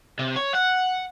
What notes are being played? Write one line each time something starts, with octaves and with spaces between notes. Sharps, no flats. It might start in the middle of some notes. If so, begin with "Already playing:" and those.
C3
C#5
F#5